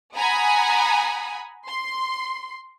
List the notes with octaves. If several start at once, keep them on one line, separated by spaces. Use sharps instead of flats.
F#5 G#5 A#5 B5 D#6
C6